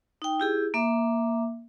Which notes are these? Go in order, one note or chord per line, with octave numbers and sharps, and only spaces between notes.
D#4 G5
E4 G4 G#4
A#3 E5 D6